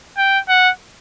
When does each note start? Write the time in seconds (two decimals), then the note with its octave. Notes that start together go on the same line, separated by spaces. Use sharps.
0.18 G5
0.48 F#5